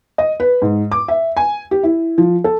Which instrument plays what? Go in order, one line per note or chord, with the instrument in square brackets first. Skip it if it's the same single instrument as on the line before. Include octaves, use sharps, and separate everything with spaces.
[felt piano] D#5
B4
G#2
D6
E5
G#5
G4
E4
F3
A4